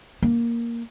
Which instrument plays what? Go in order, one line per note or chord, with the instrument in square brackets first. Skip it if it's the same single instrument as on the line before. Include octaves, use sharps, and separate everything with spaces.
[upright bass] A#3